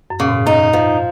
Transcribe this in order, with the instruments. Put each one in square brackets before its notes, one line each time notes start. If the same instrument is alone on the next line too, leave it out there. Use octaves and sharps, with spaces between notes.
[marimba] F#2
[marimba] A#2 [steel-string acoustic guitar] C#3
[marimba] G#2
[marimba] F#2 [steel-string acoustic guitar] D#4
[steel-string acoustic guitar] F3